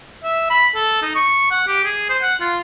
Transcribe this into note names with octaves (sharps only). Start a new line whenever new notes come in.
E5
B5
A4
D#4
C#6
F#5
G4
G#4
C5
F#5
F4